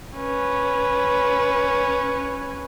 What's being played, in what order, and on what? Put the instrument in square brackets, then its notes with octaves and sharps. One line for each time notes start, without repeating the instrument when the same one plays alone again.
[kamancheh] C#4 B4